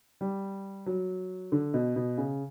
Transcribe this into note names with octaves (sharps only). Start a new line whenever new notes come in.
G3
F#3
D3
B2
B2
C#3